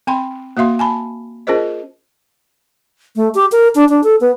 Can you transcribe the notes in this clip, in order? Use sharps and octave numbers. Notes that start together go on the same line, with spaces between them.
C4 G5 B5 C6
A#3 F#4 E5 F5 C6
G#5 A5 B5
C#4 F4 G#4 A#4 C5 D#5
A3
G4
A#4
D4
D4
A4
B3